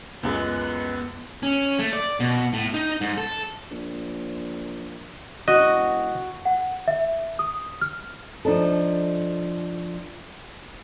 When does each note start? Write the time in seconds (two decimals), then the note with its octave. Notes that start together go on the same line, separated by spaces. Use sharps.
0.23 C#2 F#2 G#3 B3
1.43 C#4
1.79 A3
1.93 D5
2.20 B2
2.53 A2
2.74 D#4
3.01 G#2
3.18 A4
3.71 A#1
5.48 E1 F#4 D#5
6.45 F#5
6.88 E5
7.39 D#6
7.81 F6
8.45 F3 D4 D#4 A4